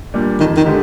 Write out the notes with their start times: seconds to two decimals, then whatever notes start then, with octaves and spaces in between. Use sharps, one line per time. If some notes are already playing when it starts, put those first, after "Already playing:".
0.14 A#2 G3 D4
0.40 F2 D#3
0.57 D#3
0.66 D3 G#3 D4 G4